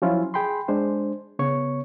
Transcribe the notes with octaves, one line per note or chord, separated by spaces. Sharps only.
F3 F#3 C#4 E4 F4
G#4 G5 B5 C6
G#3 D4 C5
C#3 B3 C#5 C#6